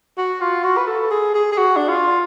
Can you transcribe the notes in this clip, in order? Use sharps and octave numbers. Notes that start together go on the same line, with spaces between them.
F#4
F4
F#4
B4
A4
G#4
G#4
G#4
F#4
D4
F4